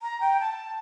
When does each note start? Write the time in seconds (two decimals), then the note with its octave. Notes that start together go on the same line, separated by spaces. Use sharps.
0.02 A#5
0.20 G5
0.40 A5